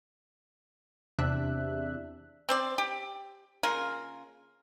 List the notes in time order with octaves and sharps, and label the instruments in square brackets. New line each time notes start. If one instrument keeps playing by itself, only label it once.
[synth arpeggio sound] E2 C3 D4 E5 F#6
[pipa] C4 C5 D5
G4
C#3 A#3 F4 A#4